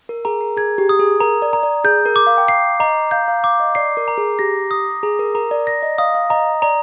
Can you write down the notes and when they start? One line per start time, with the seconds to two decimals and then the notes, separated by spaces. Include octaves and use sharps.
0.09 A#4
0.25 G#4 A#5
0.41 A#4
0.57 G#4 G#6
0.78 G4
0.89 D#6
0.99 G#4
1.20 A#4 A#5
1.42 D5
1.53 A#5
1.63 D5
1.84 G#4 G6
2.06 A#4
2.16 D6
2.27 F5
2.38 G5
2.48 F5 C7
2.80 D#5 A#5
3.11 F5 G6
3.28 F5
3.44 F5 D6
3.60 D#5
3.75 D5 C7
3.97 A#4
4.08 A#5
4.18 G#4
4.39 G4 A#6
4.71 D#6
5.03 G#4 A#5
5.19 A#4
5.35 A#4 A#5
5.51 D5
5.67 D5 A#6
5.83 D#5
5.98 F5 D#6
6.15 F5
6.30 D#5 A#5
6.62 D5 A#5